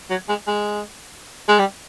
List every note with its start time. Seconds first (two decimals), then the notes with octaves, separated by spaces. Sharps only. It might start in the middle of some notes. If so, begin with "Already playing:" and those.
0.10 F#3
0.29 G#3
0.47 G#3
1.48 G#3
1.59 G3